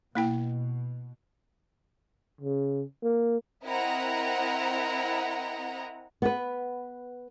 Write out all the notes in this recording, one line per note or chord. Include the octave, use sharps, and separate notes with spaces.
B2 A#3 E4 G5
C#3
A#3
C4 E4 A#4 D#5 F#5 A#5
B3 B4